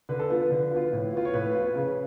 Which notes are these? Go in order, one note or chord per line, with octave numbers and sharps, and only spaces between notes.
D3 B4
A4
F3 B3 F4 B4
B4
D3
F3 B3 F4
A2
F3 B3 F4
C#5
A2 B4
F3 B3 F4
C#3